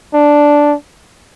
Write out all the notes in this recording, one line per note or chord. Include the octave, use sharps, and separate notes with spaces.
D4